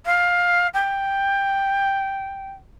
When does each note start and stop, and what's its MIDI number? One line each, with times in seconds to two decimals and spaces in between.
0.05 0.67 77
0.74 2.50 79